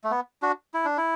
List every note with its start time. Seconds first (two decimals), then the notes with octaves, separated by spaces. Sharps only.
0.04 A3
0.11 B3
0.42 D4 F#4
0.74 E4
0.85 D4
0.98 E4